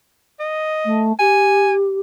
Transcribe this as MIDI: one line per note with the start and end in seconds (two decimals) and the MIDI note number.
0.40 1.09 75
0.85 1.12 57
1.19 2.00 67
1.19 1.73 80